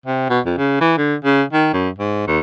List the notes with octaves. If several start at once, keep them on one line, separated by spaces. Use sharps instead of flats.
C3
B2
F2
C#3
E3
D3
C#3
D#3
F#2
G#2
D#2